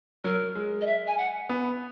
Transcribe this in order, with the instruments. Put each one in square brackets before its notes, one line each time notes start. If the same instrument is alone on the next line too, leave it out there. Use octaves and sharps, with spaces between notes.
[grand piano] F#3 [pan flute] A#4
[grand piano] G#3
[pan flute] D#5
E5
G#5
F#5
[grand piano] B3